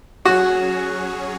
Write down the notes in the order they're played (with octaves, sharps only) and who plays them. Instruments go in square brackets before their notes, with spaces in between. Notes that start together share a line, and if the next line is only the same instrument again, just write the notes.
[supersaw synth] F#3 C#4 G#4 C#5 [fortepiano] F#4